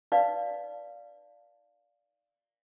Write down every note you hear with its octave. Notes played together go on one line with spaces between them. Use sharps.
D#4 B4 D5 F5